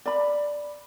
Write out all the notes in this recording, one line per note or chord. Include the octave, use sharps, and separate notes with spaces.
D5 B5